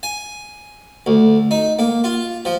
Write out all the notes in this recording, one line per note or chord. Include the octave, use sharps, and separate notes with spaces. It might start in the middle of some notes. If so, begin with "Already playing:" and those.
G#5
D2
D#4
A#3
F4
F3